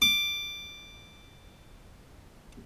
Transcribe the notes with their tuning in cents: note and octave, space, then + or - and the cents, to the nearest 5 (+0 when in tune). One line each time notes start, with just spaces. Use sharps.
D6 +5